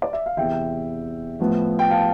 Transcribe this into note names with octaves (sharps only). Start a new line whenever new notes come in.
D5
E5
F5
E2 C3 E3 E5 G5
A2 F3 B3
G5
F5 A5